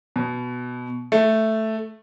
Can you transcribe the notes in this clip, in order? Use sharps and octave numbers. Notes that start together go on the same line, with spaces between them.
B2
A3